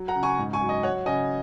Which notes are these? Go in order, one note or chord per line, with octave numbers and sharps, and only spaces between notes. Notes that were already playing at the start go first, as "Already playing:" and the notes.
Already playing: F#3
F#5 A#5
C#3
G#5 C#6
G#2
G#5 C#6
F#3
D#5
F#3 C#5 F#5
C#3 D#5 G#5